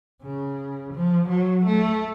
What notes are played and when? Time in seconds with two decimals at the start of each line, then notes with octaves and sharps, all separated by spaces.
0.23 C#3
0.94 F3
1.29 F#3
1.66 A3